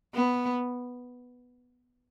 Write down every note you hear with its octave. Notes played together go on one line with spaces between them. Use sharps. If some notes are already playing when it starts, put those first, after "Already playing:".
B3